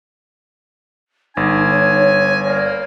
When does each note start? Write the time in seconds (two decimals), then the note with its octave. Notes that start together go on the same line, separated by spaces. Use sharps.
1.37 G1 D#4 G#5
1.70 C#5
2.46 A#3 D5